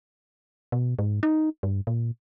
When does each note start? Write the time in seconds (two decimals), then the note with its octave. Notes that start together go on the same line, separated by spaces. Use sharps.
0.72 B2
0.99 G#2
1.23 D#4
1.63 G2
1.87 A#2